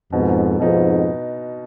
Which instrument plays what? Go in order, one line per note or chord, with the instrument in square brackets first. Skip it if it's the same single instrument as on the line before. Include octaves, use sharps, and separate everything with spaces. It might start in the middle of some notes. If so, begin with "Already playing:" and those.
[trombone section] F2 G#2 [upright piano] B2 B3 D#4
[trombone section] F2 G#2 [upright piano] B2 B3 D#4